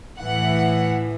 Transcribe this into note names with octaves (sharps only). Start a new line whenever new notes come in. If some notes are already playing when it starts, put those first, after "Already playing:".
A2 E3 F#5